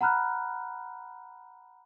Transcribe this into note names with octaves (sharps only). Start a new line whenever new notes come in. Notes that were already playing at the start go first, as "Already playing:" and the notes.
F#5 A#5 B5 F6 F#6